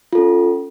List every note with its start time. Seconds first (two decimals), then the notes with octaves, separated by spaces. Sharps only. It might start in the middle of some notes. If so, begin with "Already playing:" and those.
0.13 F4
0.15 A4
0.18 C#4